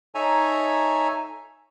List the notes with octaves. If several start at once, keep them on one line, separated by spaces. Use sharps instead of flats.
D#4 A4 C#5 E5 G#5 A#5